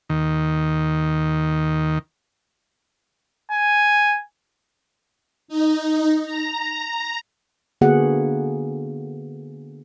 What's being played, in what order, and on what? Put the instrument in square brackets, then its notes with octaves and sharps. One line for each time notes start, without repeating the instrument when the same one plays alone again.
[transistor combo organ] D#2 D#3
[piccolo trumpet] G#5
[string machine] D#4
A#5
[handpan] D3 A#3 B3 F#4 G#4 F#5